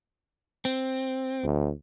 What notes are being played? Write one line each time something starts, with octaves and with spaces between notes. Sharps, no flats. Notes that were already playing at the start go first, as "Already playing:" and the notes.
C4
D2